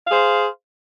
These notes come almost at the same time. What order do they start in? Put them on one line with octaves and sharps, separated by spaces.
F5 G#4 C5